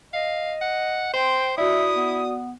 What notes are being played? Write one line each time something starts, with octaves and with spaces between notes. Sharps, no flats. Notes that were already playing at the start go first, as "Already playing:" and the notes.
D#5 F5
F#5
C5 G5 C6
E4 F#4 D5 E5 D#6
B3